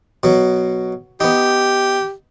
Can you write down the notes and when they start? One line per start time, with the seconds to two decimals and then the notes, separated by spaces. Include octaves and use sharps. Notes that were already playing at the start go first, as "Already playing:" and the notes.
0.23 B2 F#3
1.20 B3 D#4 G4